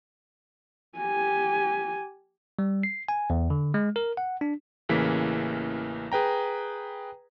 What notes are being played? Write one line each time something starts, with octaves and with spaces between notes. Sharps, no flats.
G4 G#5
G3
C7
G#5
E2
D3
G#3
A#4
F#5
D4
A1 C#3 E3 A#3 B6
G#4 B4 G5 A#5